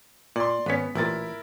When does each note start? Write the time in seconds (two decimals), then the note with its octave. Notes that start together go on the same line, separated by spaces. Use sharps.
0.36 A#2 D5 C6
0.66 G#1 B3 C#4 B6
0.95 A1 A#2 E4 A#4 A6